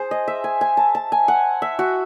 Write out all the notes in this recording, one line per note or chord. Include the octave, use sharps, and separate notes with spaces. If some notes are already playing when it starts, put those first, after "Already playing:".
Already playing: G#4 C5
D#5
E5
G#5
G#5
A5
A5
G#5
F#5
E5
F#4